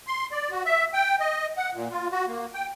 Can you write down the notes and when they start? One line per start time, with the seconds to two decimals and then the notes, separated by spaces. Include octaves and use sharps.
0.07 C6
0.32 D5
0.51 F#4
0.65 E5
0.94 G5
1.20 D#5
1.57 F#5
1.74 A#2
1.91 F4
2.11 F#4
2.27 A#3
2.53 G5